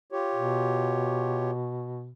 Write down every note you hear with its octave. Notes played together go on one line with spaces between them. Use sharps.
F4 G4 C#5
B2